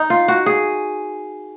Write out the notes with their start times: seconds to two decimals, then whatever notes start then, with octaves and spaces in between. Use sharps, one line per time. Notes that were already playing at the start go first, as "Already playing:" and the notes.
Already playing: D#4
0.10 F4
0.28 F#4
0.46 G#4